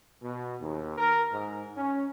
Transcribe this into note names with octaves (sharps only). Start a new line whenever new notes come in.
B2
D#2
A#4
G#2
C#4